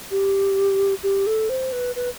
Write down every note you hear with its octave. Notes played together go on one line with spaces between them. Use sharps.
G4
G4
A4
C5
B4
B4